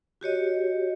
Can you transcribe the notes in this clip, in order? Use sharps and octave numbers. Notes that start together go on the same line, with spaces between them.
F#4 G4 C#5 D#5